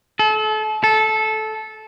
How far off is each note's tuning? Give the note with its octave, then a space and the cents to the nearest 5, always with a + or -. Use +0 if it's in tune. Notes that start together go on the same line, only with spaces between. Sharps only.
A4 -35
A4 -15